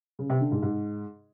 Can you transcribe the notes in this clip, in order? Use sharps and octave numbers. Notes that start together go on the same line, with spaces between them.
C#3
C3
D3
G#2
G#2